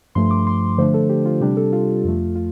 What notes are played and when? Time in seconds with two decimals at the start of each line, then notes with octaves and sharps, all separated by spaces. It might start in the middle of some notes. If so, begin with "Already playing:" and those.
0.15 G2 F3 A3 C6
0.31 D6
0.47 C6
0.78 D3 F3 A3 D4 C5
0.94 A4
1.09 G4
1.25 F4
1.41 C3 G3 D4 G4
1.57 A4
1.73 F4
2.04 F2 F3 A3
2.35 F4